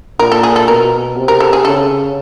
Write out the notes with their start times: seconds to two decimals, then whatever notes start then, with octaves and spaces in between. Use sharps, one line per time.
0.19 A#2 A#4
0.32 A4
0.43 G#4
0.56 A4
0.68 B2 A#4
1.16 C3
1.28 A#4
1.40 A4
1.53 G#4
1.65 C#3 A4